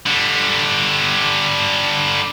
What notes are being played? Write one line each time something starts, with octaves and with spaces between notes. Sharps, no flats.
D3 G3